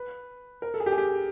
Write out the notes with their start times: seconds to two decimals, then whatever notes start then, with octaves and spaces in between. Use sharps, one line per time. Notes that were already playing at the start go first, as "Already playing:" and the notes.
Already playing: B4
0.62 A#4
0.74 A4
0.80 G#4
0.86 G4
0.92 G#4
0.98 G4